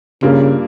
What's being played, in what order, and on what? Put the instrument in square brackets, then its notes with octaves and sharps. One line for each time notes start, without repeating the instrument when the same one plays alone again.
[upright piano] G2 G3 A#3 F4 [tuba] C#3